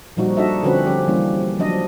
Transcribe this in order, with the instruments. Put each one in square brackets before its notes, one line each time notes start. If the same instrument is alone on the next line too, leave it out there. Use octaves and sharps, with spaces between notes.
[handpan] A#2 F3 G3 D#4 F#4
D4 D#4 F#4 A4 D#5 E5
D3 F3 C4 C#4 F#4 B4
F3 C#4 G4
E3 G3 A#3 C#4
F3 F#3 D4 D#5